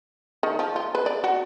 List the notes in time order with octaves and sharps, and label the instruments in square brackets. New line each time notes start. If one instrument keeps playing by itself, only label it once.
[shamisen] D#3
F3
F4
B4
D5
F#4